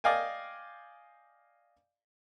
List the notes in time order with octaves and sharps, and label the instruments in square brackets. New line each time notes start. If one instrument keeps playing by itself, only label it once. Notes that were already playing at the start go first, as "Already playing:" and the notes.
[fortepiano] D5 D#5 F5 G5 G#5